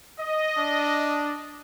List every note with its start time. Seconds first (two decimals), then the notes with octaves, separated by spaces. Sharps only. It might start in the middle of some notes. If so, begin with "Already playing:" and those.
0.19 D#5
0.58 D4